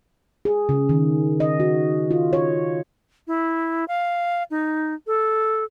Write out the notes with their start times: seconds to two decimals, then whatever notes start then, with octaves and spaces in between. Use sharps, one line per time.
0.45 G#4
0.69 C#3
0.89 D#3
1.40 D#5
1.60 F#4
2.11 F4
2.33 C#5
3.27 E4
3.88 F5
4.51 D#4
5.07 A4